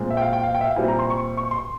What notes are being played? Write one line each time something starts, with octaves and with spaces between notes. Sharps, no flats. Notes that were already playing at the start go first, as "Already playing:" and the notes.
Already playing: A#2 G#3 C4
E5
G5
F5
G5
F5
G5
E5
F5
A#2 G3 C4 E4 G#5
A#5
C6
C#6
C#6
C6